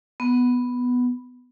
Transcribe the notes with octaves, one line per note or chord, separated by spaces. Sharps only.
B3